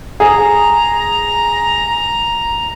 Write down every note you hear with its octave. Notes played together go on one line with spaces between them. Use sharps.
G#4 A#5